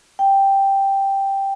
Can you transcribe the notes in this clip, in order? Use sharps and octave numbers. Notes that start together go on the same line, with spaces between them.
G5